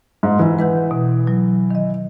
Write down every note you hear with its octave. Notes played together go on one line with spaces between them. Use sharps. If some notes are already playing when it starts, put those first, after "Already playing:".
G#2
E3
B4 F#5 G6
B2
B2 F#3
D#3 D#5